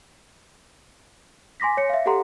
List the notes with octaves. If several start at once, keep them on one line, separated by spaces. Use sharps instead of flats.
G#5 C6 D6 A#6 B6
C#5 C#7
E5 F5
G4 A4 F#5 A#5 C6